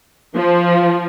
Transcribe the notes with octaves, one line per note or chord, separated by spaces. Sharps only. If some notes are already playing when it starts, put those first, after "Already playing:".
F3